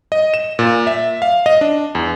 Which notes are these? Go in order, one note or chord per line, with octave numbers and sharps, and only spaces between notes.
D#5
E7
A#2
E5
F5
D#5
D4
E2